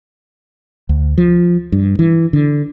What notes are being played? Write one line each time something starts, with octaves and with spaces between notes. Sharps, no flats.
D2
F3
G2
E3
D3